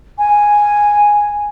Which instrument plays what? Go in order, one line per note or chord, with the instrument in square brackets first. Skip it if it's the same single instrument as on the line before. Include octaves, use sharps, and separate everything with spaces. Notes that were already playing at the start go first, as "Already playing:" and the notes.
[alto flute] G#5